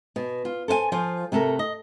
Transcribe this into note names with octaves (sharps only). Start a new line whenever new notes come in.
B2
F4
A4 C5 F5 G#5
F3 F4 C5 G#5
C3 A3 A4 A#4
D#5